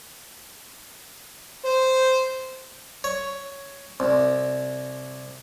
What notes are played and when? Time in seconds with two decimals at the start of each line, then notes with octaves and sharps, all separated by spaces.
1.65 C5
3.04 C#5
4.00 C2